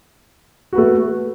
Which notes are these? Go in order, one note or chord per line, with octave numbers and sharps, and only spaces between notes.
A3 F#4 B4